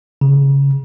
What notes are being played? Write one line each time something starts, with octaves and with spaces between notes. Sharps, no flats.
C#3